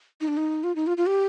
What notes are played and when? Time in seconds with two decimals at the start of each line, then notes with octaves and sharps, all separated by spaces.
0.21 D#4
0.28 D4
0.37 D#4
0.64 F4
0.76 D#4
0.87 F4
0.97 F4
1.07 G4